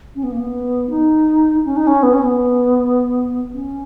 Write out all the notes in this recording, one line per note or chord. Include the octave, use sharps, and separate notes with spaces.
C#4
B3
A#3
B3
D#4
C#4
D#4
C#4
B3
C#4
B3
C#4